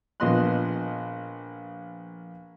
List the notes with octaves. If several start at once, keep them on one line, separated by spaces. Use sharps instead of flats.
A#1 F3 B3 D#5 C6 F#6